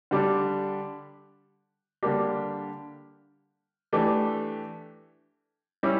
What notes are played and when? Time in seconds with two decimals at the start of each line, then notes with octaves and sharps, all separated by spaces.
0.11 D3 G3 D4 G4
2.03 D3 G3 A#3 D4 G4
3.93 E3 A3 D4 G4
5.83 G3 C#4 E4 G4